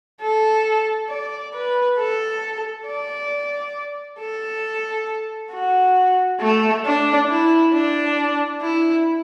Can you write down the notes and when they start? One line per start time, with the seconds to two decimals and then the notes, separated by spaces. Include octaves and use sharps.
0.21 A4
1.09 D5
1.53 B4
1.98 A4
2.86 D5
4.19 A4
5.52 F#4
6.41 A3
6.85 D4
7.29 E4
7.73 D4
8.61 E4